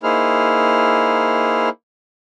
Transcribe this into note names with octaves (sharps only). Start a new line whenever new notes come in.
A#3 D#4 E4 G#4 C5 F6